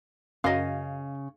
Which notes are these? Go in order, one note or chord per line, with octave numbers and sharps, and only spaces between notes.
F#2 C#3 D#5 F5